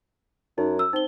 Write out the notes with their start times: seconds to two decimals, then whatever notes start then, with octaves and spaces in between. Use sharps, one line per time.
0.58 F#2 D#4
0.79 E6
0.93 C4 D#4 G7